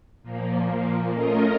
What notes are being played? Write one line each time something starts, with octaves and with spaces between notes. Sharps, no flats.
A#2 F3 A#3
A3 C#4 F4 A#4 D#5